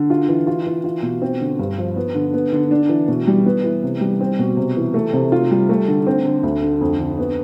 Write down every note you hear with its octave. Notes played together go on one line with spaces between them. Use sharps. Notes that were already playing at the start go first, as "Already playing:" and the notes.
Already playing: D3
F4
E3
F4
E3
F4
B2
C4
D3
G2
F3
B3
D3
B3
D3
D4
E3
B2
G3
B3
E3
C3
G3
C4
B2
C3
E3
A3
C3
F4
G3
A3
D3
C4
D3
D2
D3
F2
D3
B3